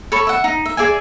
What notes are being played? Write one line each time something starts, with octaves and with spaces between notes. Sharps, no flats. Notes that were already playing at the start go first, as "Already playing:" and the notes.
A4 C#5 B5
E5 F#5
D#4
E5
G#4 D5 E5 G#5